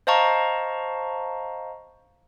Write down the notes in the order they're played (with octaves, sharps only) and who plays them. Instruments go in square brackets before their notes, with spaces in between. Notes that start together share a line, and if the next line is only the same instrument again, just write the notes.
[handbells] C5 D#5 F5 A5 A#5 C#6